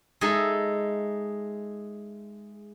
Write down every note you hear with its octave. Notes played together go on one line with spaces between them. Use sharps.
G#3 D#4 G#4 A4 D#5 E5